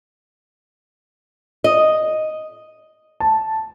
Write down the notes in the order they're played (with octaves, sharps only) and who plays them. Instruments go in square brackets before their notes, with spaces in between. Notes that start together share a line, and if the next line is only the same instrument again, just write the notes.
[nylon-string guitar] D#5
[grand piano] A5